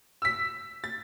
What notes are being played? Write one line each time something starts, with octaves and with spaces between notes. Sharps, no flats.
E6 B6
A6